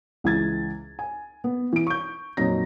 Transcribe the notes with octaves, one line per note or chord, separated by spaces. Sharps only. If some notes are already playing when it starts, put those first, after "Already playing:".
C#2 E3 G#6 A6
G#5
B3
E3 D7
C#6 G6
F2 A#2 F#3 D#4 A#6